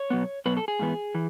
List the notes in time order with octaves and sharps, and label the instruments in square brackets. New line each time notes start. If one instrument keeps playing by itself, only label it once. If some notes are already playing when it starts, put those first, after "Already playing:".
Already playing: [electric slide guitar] C#5
B2 F#3 B3
B2 F#3 B3 B4
A4
G#4
G#2 E3 B3
E3